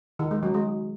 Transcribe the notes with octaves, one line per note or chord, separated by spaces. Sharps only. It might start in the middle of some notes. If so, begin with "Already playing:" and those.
D#3
G#3
F#3
G#3